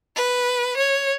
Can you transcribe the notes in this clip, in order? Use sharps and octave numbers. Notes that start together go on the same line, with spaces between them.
B4
C#5